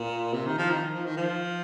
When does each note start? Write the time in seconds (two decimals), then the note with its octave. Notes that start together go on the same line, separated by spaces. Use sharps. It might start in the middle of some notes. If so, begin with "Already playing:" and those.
Already playing: A#2
0.34 C3
0.47 D#3
0.58 F3
0.70 D#3
0.94 F3
1.05 D#3
1.17 F3